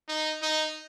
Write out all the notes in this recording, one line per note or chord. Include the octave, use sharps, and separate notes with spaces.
D#4
D#4